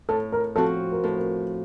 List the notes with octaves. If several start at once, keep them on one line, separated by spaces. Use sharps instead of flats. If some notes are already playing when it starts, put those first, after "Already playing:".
A2 A4
A#4
F3 C4 F#4 A4
A#4
A2 A4
A#4